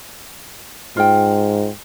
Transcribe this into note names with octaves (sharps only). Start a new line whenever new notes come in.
G#2 F4 G5